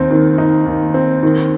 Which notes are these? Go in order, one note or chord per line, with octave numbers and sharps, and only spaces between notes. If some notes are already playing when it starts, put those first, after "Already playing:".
Already playing: D#2 C4 D#4
D#3
D#4
D#2
C4
D#3